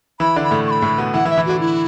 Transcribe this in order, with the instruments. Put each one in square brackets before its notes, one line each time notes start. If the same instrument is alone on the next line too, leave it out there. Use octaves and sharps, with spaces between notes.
[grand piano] E3 E4 [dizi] B5
[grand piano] D3 D4
[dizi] B5
[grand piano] A2 A3
[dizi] C#6
B5
[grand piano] A2 A3
B2 B3
[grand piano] E3 E4 [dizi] F#5
[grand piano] E3 E4
[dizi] E5
[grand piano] E3 E4
[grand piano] D3 D4 [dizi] F#4
[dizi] E4